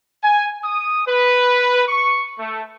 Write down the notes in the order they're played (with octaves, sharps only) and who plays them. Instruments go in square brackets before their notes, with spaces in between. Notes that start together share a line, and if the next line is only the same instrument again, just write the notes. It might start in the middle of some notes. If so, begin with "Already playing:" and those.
[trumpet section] G#5
D#6
B4
C#6
A3